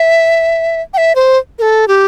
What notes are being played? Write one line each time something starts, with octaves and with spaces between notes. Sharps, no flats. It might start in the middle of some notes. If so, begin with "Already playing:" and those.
Already playing: E5
G5
E5
C5
A#4
A4
G4